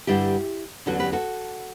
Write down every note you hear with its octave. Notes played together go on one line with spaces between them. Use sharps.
G2 D3 G3 D4 E4 G4
E2 D3 F#3 C#4 F#4 A4
G4 B4
F#4 A4